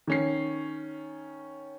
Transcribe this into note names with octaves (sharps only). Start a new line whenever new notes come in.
D#3 C#4 C7